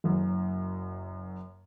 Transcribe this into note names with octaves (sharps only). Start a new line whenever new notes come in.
F#1 F#2